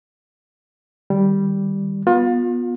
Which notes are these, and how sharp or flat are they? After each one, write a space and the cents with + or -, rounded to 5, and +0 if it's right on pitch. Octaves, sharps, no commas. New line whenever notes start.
D#3 -25 G3 +0
B3 -15 F4 +30